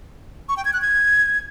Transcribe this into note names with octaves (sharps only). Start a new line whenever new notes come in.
C#6
G5
G#6
F#6
G#6